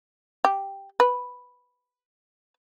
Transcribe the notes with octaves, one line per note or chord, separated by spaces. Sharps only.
G4
B4